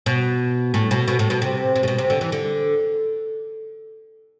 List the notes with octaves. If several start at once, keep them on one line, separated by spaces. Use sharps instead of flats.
B2
A2
B2
B2
A2
B2
C3
C3
A2
B2
C3
D3
E3
D3